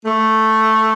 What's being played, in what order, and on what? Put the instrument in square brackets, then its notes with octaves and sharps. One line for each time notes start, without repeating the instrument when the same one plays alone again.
[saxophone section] A3